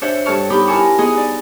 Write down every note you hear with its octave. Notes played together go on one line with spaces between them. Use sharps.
D4 F#4 C5 C#5 E5 F#5
G2 A4 C#5 A5 C#6 F6
B3 D#4 F4 G4 B5 D6
E4 A#4 G#5 A5 C#6 D6
B3 F#4 G#4 D#5 C6
D#4 D5